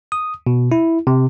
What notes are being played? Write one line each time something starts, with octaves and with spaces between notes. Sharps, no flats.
D#6
B2
E4
C3